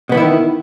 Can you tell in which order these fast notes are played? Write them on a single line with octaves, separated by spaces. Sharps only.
B2 B3 E3 E4 D#3